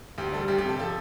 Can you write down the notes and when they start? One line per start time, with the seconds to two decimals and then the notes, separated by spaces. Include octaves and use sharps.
0.18 D2 G4
0.33 G3 A4
0.48 D2 G4
0.58 G4
0.64 C3 A4
0.79 F3 A4